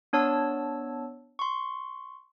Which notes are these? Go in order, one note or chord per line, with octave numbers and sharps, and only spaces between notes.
B3 D4 C#5 A5 E6
C6 C#6